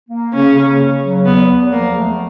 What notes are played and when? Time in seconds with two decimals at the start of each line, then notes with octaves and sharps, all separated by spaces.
0.09 A#3
0.33 C#3 C#4
0.56 C#3
0.79 C#3
1.02 F#3
1.25 E2 B3
1.49 E2
1.72 F3 A#3
1.95 A3